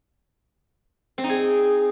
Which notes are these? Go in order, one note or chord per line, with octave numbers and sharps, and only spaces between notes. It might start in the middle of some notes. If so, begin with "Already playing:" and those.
C4
D#4
G#4